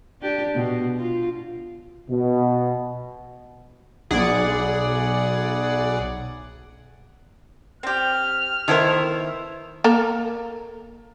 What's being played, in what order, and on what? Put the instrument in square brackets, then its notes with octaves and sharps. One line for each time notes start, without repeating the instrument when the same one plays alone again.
[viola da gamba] D4 G4
B2
F4
[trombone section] B2
[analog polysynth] B1 G#4 D5 F#5
[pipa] C4 G4 [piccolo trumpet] F6
[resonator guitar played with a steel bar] D#3 E4 C5 [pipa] A3 B3 A#4
[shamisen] A#3 A4 A#4